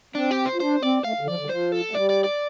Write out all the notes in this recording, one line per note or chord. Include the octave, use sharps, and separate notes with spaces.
C4 D4
G4
C5
F4
D4 C5
C4 D5
A3 F5
D3
F3 D5
D3
G3
F3 C5
A4
A3
G3 D5
D5
D5